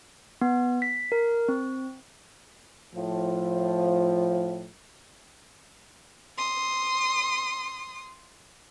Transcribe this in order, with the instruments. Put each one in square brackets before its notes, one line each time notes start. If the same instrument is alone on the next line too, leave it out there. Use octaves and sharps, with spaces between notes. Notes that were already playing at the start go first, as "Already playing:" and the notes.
[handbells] B3
B6
A#4
C4
[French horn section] A2 F3
[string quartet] C6 D#6